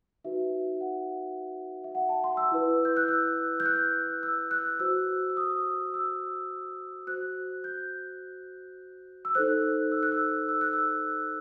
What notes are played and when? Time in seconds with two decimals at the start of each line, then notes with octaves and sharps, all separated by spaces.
0.24 D#4 F#4 B4 E5
0.81 F#5
1.84 E5
1.95 F#5
2.09 A5
2.24 C6
2.37 E6
2.52 E4 B4
2.85 G6
2.97 F#6
3.09 E6
3.60 G6
3.66 F#6
4.23 E6
4.51 F#6
4.80 F#4 C5 E6
5.30 E6
5.37 D#6
5.94 E6
7.07 F#4 C5 F#6
7.64 G6
9.25 E6
9.35 D#4 A4 C5 F#6
9.92 E6
10.03 F#6
10.12 E6
10.49 E6
10.61 F#6
10.73 E6